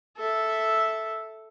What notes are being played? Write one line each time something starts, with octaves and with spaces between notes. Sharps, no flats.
A4 E5